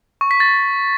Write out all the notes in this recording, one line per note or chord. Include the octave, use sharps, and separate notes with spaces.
C#6
B6
A6